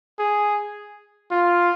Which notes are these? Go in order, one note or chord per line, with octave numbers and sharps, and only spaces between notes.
G#4
F4